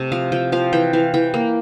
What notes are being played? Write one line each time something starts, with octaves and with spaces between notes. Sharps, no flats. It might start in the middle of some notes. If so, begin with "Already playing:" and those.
Already playing: C3 A3 G5
F3 F5
F3 G5
F3 F5
E3 G5
E3 F5
E3 G5
A#3